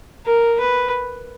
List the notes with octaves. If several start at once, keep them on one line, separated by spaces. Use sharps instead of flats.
A#4
B4